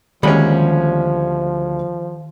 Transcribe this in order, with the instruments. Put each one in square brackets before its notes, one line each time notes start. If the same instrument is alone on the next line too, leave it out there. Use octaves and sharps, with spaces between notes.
[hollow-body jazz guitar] D2 A#3 B5 [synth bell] D#3 [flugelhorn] F3 [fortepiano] G3 G#3 C#4